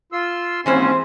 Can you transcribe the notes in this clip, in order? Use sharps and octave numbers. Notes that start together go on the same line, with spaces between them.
F4 C6 E6
D#2 G#2 E3 G#3 C4 C#4 G#4 C5